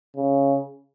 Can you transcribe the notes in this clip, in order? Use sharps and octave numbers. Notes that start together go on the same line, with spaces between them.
C#3